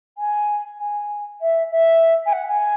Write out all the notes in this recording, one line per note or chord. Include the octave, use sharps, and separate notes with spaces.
G#5
G#5
E5
E5
G#5
F#5
G#5